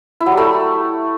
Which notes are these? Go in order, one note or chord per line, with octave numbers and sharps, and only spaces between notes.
E4
F#3
G3
A3